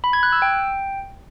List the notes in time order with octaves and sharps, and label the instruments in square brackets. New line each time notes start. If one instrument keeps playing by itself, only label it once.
[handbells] B5
G#6
F#6
E6
G5